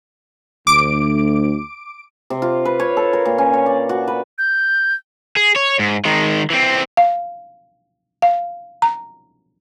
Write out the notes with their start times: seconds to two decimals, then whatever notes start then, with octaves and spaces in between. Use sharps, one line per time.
0.67 D2 D6 D7
2.30 C3
2.42 F4
2.65 B4
2.80 C#5
2.97 A4
3.13 A#4
3.25 A#2
3.38 C#4
3.54 C#5
3.66 D5
3.89 F#4
4.08 B4
4.38 G6
5.36 G#4
5.56 C#5
5.79 G#2
6.05 D#3 G#3
6.50 E3 C4
6.97 F5
8.22 F5
8.82 A#5